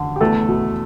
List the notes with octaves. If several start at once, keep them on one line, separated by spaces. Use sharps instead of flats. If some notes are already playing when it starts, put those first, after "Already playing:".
Already playing: D3
G4
E2 A3 A4
B2